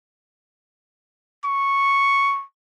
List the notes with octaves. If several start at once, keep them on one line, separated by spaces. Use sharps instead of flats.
C#6